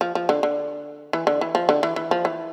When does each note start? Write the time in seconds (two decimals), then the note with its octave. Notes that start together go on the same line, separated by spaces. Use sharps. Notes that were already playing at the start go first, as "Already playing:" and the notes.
0.01 F3
0.15 F3
0.29 D3
0.43 D3
1.13 E3
1.27 D3
1.41 E3
1.55 F3
1.69 D3
1.83 E3
1.96 E3
2.11 F3
2.25 E3